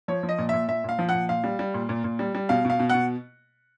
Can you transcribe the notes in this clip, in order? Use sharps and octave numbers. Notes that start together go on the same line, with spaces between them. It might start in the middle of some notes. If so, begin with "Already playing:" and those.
F3 C#5
F3
D#5
A#2
A#2 E5
A#2 E5
A#2 F5
F3
F#5
A#2
A#2 F5
G3
G3
A#2
A#2
A#2
G3
G3
B2 F5
B2 F5
B2
B2 F#5